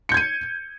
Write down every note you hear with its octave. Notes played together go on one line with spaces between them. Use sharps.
G6 G#6 C#7 D#7